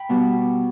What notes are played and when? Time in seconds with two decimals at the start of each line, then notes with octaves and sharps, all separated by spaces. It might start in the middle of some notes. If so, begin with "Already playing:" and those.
Already playing: G5 B5
0.09 B2 G3 B3